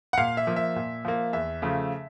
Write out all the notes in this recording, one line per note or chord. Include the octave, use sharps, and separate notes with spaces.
F#5
A#2 F5
E5
F3 A#3
E5
A#2
F3 A#3
E2 E5
C#3 F3 A3